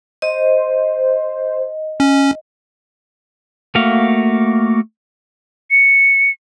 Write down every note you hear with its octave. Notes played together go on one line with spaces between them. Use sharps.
C5 D#5
C#4
A3 A#3 F#4 F5
C#7